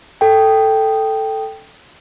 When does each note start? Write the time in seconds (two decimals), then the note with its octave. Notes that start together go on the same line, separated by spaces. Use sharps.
0.21 A4 G5